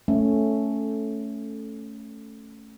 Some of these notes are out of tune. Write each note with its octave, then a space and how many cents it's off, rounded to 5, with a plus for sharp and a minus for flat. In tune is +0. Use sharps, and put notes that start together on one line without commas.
A3 +0 C#4 +0